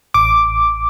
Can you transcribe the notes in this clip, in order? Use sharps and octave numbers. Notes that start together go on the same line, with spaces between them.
A1 D6